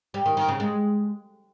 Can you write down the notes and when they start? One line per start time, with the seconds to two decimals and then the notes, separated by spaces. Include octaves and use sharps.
0.14 G3
0.26 D#3
0.37 D#3
0.48 C#3
0.60 G#3